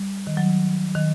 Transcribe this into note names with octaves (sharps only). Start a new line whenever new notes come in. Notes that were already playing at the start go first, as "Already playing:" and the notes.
Already playing: G3
D#3
F#3
D#3